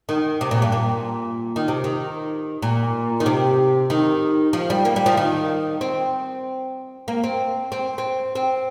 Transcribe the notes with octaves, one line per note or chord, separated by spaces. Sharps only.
D#3
C3
A#2
G2
A#2
D#3
C3
D#3
A#2
D#3
C3
D#3
F3
G3
A#3
G3
F3
D#3
C4
A#3
C4
C4
C4
C4